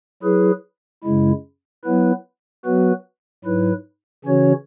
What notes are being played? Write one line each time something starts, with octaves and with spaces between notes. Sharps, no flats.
F#3 E4 G#4 B4
F#2 C#3 G#3 E4
F#3 B3 E4 B4
F#3 B3 F#4 B4
G#2 F#3 E4 B4
C#3 E3 C#4 F#4 C#5